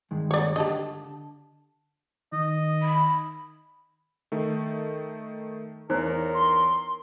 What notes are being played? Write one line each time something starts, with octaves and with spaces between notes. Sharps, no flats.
G2 D#3 G#3
C#5 D5
D3 G4 D#5 A5
D#3 D#5
B5
D#3 A3
E2 D#4 A#4 C5 C#5
C6